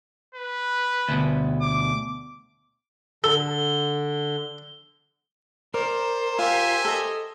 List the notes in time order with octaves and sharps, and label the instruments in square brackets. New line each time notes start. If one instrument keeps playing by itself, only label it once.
[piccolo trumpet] B4
[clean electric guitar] D2 B2
[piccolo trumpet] D6
[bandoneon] D3 [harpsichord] A4 [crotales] G7
[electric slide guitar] A#4 [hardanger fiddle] C5 [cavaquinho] D5
[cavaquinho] F4 [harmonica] G4 E5 G#5
[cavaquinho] A4 D#5